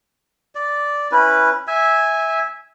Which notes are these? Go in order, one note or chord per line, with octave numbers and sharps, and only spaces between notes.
D5
C#4 E4 B4
E5 G#5